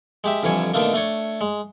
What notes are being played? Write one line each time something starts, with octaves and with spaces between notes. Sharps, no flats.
G#3 G4 E5
F2 D3 E3 G3 C#5 G#5
B2 D3 D#3 A3 A#3
A3 D4 C#5
G#3